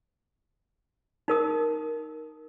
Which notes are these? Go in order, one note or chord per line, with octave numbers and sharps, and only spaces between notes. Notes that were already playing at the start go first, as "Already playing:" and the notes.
D#4 A#4 D#6